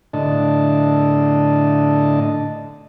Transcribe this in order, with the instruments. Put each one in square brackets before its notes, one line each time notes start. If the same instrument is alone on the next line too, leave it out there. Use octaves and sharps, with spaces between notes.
[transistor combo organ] A2 D3 D4 D#5 A5